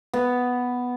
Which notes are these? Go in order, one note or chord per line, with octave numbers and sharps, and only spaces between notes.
B3